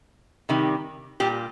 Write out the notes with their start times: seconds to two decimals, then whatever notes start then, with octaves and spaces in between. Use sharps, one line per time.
0.49 C3 D#3 G3
1.20 A#2 G3 G4